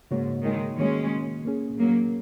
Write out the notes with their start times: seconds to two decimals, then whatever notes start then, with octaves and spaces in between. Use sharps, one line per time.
0.11 G#2 C#3 A#3 F#4 C#5
0.44 D#3 G#3
0.78 D#3 G#3 A#3 C#4 F#4
1.45 A#3 C#4 G#4
1.78 F#3 A#3